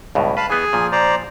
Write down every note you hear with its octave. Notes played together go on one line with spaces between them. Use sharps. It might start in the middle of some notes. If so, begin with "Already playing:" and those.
C#2 G2 B2
B4 F5 A5 B5
E3 B3 G#4 D#5 G#5
A#2 F3
C5 D5 A#5